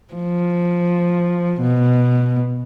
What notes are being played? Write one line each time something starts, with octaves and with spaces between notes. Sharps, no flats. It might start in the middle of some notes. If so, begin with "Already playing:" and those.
F3
B2